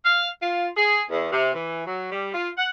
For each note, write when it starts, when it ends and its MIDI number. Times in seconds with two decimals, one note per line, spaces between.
0.05 0.28 77
0.42 0.68 65
0.77 1.02 68
1.10 1.28 40
1.32 1.50 48
1.54 1.85 52
1.86 2.09 54
2.11 2.30 55
2.34 2.49 65
2.58 2.69 78